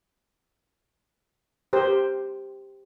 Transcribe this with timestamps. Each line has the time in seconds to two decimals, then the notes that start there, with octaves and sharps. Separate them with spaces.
1.73 G4 A#4 C5